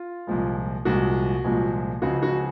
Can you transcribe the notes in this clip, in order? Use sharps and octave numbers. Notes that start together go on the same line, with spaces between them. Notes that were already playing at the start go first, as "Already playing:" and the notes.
Already playing: F4
C2 A#2 F3 G#3
C2 A#2 F3 G#3 F#4
C2 A#2 F3 G#3
C#2 C#3 F3 G#3 F#4
F#4